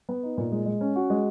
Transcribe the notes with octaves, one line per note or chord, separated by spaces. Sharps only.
B3
D#4
A#2
G#3
G#3
C#4
F#4
G#3